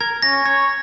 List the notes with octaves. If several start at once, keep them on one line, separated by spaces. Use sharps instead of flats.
A#4 G#6
C#4 A#6
C#5 G#6